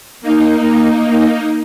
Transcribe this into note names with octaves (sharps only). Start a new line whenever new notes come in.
A#3 D#4